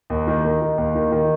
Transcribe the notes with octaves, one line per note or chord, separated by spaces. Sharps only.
D#2
D#3
D#3
D#3
D#2
D#3
D#3